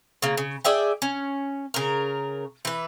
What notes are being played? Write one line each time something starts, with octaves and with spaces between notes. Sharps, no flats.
C#3 A#3
C#3
G#4 D5 E5 G5
C#4
C#3 A#4
E3 B4